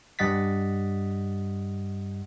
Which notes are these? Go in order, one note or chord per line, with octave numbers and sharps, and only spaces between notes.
G2 G3 D#5 F#5 A6 B6